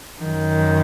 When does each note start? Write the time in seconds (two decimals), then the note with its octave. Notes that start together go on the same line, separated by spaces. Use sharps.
0.21 F#2 D#3